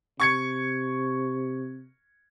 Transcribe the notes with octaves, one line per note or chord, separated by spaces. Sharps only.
C3 C#6 G#6 C#7